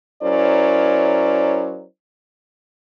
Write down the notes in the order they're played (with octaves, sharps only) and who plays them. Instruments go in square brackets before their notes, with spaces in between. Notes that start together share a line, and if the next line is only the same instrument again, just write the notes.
[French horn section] F#3 C#4 E4 A#4 C5 D5